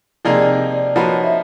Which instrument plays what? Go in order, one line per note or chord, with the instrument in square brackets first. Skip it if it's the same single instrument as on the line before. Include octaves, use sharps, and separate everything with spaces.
[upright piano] C3 F3 A#3 D#4 G#4 [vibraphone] D5
[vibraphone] D5
[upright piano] F3 A#3 D#4 F#4 B4 [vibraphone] C#5
[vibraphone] E5